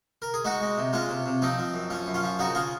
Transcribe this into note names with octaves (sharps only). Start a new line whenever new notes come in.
A#4
G#4
G#3 D#4 F#4
G#3
C3
G#3 C#4 F4
C3
C3
F3 C4 D#4
F3
F#2
F3 C#4
F#2
C#4 F4
F3
C#3 D#4 F#4
C#3 F4 G#4